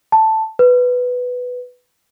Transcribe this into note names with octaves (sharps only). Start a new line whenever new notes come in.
A5
B4